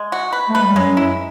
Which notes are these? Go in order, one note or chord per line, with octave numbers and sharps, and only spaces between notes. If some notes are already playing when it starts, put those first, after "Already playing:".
Already playing: G#3
F#4
B4
A3
G#3 B4
G3
F#2 F#3 G#3
E4